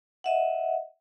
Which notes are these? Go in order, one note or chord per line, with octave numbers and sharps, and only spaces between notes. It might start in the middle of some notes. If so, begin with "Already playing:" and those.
D#5 E5 F#5